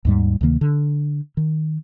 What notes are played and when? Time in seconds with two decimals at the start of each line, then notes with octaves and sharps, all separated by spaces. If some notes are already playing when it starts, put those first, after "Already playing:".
0.05 D#2 G#2 G3
0.41 D2 C3 D#3 A#3
0.61 D3
1.37 D#3